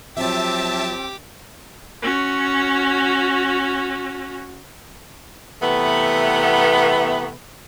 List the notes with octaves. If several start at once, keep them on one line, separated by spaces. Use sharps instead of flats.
F3 F#3 C4 G4 E5 A5 D6
C#4 F#4
C3 E3 A3 B3